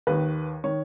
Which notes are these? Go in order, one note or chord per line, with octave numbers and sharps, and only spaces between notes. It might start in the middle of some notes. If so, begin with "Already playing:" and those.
D#2 D#3 B4
D#3 C#5